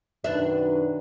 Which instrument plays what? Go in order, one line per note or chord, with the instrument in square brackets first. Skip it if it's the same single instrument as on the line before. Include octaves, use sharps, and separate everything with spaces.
[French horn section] F#2 D#3 B4 [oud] B2 D4 E5